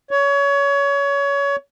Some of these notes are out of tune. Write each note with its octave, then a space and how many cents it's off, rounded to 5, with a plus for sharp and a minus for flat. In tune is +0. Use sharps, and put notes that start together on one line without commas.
C#5 +25